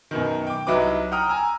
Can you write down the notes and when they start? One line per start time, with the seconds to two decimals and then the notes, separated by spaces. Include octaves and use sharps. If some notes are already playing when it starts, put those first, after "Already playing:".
0.11 F#2 B2 D#3
0.47 G5 D6
0.67 C2 F#3 D#4 E4 B4 D6
1.11 F#5 G5 A#5 D#6 F6
1.28 G#5 A#5 E6